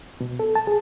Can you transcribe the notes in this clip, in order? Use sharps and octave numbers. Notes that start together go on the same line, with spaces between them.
B2
A4
A5
G#4